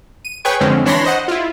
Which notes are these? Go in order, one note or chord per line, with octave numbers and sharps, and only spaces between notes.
D#7
G#4 B4 C#5 G5 C#6
F2 D3 G#3 C4 C#4
E3 D4 C#5 B5 C6 A#6
C5 D#5 F#5
E4 F4